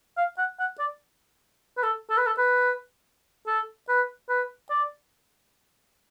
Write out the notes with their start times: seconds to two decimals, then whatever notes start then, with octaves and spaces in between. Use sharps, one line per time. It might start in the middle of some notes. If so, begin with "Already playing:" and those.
0.18 F5
0.38 F#5
0.59 F#5
0.80 D5
1.78 B4
1.83 A4
2.10 A4
2.18 B4
2.27 A4
2.38 B4
3.47 A4
3.89 B4
4.30 B4
4.70 D5